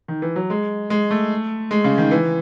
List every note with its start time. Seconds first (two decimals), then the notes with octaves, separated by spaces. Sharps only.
0.08 D#3
0.22 E3
0.36 F#3
0.50 G#3
0.90 G#3
1.11 A3
1.71 G#3
1.84 C#3
1.98 D#3
2.11 E3